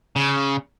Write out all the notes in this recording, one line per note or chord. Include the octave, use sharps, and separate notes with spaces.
C#3